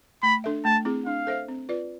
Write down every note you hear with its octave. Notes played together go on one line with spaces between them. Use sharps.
A3 B5
D4 A4 E5
A3 A5
C4 E4 G#4
D4 F5
A4 C5 E5
C4
F4 B4 D5